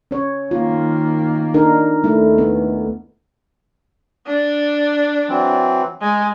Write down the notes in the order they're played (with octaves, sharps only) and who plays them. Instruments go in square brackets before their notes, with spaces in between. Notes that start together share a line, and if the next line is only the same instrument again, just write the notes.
[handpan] C#4 C#5
[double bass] D#3 A#3 [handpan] F4
[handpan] D4 D#4 A#4
[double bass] D#2 [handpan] A3 E4
[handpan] B3
[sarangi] D4
[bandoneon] E3 F#3 C4
[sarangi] G#3 [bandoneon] G#5